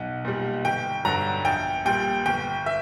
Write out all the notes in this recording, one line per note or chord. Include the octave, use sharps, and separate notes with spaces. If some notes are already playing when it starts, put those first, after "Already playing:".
Already playing: B1 F#5
A#2 G3
G1 G5
G2 D3 F#3 A#5
A#1 G5
A#2 G3 G5
G1 G5
E5